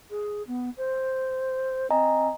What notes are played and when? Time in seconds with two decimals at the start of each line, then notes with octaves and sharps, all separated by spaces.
0.10 G#4
0.47 B3
0.77 C5
1.90 C4 D#5 G#5 A#5